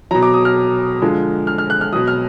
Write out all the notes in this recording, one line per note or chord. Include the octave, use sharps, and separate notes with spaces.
B2 F#3 A#5
D6
D#6
F6
D3 F3 G#3
F6
F6
F#6
F6
B2 F#3 D#6
F6